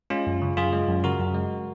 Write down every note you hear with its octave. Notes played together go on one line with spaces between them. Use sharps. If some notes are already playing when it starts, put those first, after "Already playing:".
G#3 C#4 F4
F#2
C#3
F#2 F4 G#4
G#3
F#2
C#3 F#4 A#4
F#2
G#3